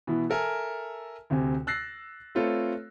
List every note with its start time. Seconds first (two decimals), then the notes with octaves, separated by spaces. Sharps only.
0.07 B2 E3 B3 E4
0.30 A4 A#4 E5 G#5 A5
1.30 D2 C3 C4 G#5
1.67 E6 F#6 A6 A#6 C7
2.35 A3 C4 F4 A4 B4 C#5